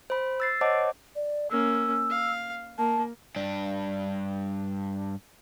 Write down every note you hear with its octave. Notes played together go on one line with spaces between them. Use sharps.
C5 B5
E6 A6 C7
C5 C#5 D#5 F#5 A5 D6
D5
A#3 C#4 E6
F5
A#3 A5
G2 D4